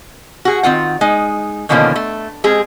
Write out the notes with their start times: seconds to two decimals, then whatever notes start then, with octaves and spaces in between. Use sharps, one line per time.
0.45 F#4 G#4
0.63 D#3 C4 F4 F#5
1.01 G#3 D#4
1.69 B2 D3 D#3 F3 A#3 C#4
1.96 A3
2.44 G#3 C4 G#4